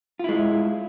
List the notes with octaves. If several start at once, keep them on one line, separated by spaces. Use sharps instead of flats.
G#3 E4 F4